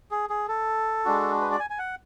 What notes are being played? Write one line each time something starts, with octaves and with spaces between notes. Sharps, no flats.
G#4
G#4
A4
G#3 D4 F#4
B4
D5
G#5
G#5
F#5